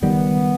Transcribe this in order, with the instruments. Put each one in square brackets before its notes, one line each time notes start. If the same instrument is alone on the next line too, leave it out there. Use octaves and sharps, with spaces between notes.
[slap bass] F#1 D#3 G3 [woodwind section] B3